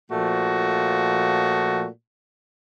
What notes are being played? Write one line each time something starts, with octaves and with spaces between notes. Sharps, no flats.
A#2 F3 A3 F#4